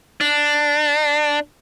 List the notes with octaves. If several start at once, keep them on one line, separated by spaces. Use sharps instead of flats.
D4